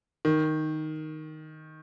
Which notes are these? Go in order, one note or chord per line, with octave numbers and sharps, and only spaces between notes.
D#3